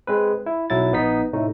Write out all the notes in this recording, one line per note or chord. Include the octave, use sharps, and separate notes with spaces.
G#3 C4 B4
E4
B1 F#3 E4 A6
A#1 B3 D#4 B6
A2 C3 A3 D#4